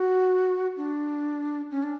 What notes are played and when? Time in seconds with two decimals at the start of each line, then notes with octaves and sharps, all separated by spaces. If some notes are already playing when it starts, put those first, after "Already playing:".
Already playing: F#4
0.77 D4
1.71 C#4
1.83 D4